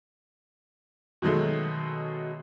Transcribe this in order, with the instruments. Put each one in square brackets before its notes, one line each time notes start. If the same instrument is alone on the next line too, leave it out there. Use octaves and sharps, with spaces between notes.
[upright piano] B2 D#3 F#3 G#3 A3